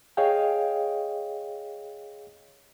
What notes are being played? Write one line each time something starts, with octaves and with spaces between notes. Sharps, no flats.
G#4 C#5 D#5 F5 G5